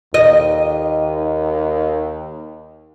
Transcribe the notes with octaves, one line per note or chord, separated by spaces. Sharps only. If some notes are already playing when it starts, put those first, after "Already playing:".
D#2 D#5